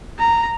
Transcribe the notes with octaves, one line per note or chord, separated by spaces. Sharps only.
A#5